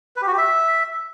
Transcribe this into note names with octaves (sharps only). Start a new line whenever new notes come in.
B4
G4
F#4
G4
E5